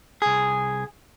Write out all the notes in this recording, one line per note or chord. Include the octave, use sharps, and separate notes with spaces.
C2 G#4